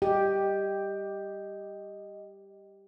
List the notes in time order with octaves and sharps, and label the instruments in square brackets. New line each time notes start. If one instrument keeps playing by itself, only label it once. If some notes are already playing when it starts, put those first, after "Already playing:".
[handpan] G4 [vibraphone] D#5